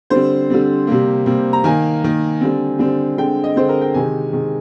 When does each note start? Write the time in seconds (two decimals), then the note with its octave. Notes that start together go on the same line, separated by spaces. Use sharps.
0.10 D3 G3 C4 C5
0.50 D3 G3 C4
0.87 C3 G3 A#3
1.26 C3 G3 A#3
1.53 A#5
1.64 D#3 A#3 G#5
2.03 D#3 A#3
2.41 D3 G3 C4
2.79 D3 G3 C4
3.18 D3 G#3 C4 G5
3.44 D#5
3.56 D3 G#3 C4 C5
3.69 A#4
3.81 G5
3.94 C3 D#3 G#3 G#5
4.33 C3 D#3 G#3